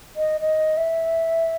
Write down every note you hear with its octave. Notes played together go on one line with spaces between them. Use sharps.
D#5
D#5
E5